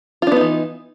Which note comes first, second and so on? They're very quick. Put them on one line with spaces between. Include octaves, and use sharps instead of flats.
F4 D4 B3 D#4 E3